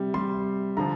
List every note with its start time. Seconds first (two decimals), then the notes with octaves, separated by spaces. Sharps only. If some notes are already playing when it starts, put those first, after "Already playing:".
Already playing: C3 G3
0.14 C3 G3 C6
0.77 D3 F3 A#5